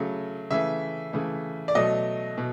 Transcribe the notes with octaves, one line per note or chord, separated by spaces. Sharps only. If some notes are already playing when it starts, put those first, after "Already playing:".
Already playing: C#3 F#3 A3
C#3 E3 A3 E5
C#3 E3 A3
D5
B2 F#3 A3 D#5
B2